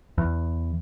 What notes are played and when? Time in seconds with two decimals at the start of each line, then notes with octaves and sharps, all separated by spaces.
0.18 E2